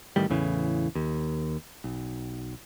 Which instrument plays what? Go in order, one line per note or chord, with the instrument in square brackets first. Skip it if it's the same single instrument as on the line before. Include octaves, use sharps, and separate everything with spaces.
[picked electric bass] A1 A2 D#3 G3
E2 A2 C#3 E3
D#2
B1